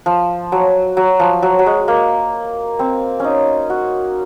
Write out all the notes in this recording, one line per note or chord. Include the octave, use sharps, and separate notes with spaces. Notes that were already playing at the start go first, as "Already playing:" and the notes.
F3
F#3
F#3
F3
F#3
F#3
G#3
A#3
C4
C#4 D#4
F#4